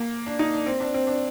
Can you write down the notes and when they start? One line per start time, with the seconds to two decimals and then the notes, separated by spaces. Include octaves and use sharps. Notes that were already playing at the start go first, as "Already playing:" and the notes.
Already playing: A#3
0.26 D4
0.39 D#4
0.54 D4
0.66 C4
0.80 D4
0.94 C4
1.07 D4